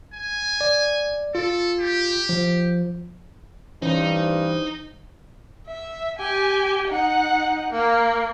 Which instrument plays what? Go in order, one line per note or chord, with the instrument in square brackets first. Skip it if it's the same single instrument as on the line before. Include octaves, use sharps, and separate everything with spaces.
[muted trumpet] G#5
[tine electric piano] D5
[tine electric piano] F4 [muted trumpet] A4
[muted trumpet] G4
[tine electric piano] F3
[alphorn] G2 [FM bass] E3 [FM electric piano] C#4 C5 [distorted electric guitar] D#4
[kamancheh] E5
G4 G#5
D#4 F#5
A#3